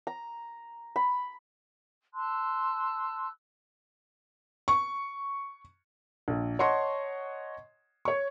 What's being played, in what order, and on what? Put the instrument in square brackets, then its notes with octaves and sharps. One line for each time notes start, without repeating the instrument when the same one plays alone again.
[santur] A#5
B5
[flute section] A5 C6 E6 F#6
[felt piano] C#6
A#1
C#5 D#5 F#5 A5 C6 C#6
C#5 C#6